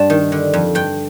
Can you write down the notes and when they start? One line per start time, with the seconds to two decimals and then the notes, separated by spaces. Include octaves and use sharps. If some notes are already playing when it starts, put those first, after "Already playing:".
Already playing: G2 G3 A5
0.10 D#3
0.32 D3
0.54 F2
0.75 G2 G5